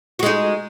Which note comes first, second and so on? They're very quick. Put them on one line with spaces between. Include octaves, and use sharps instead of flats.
F#4 G#3 D#4